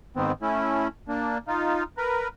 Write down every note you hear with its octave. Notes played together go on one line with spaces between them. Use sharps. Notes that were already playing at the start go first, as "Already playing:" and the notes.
G#2 D#3 B3 C4
A3 C#4 E4
A#3 D4
D#4 F4
A#4 B4